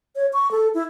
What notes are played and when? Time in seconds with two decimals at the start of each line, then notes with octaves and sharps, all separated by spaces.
0.16 C#5
0.33 C#6
0.51 A4
0.74 E4